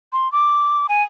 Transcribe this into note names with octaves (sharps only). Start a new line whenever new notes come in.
C6
D6
G#5